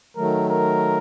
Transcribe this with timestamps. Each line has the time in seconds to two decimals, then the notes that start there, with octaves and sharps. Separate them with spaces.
0.17 D#3 F#3 A3 A#4
0.49 A#4